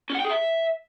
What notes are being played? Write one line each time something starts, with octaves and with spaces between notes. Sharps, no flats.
C#4
F#5
G5
G#4
E5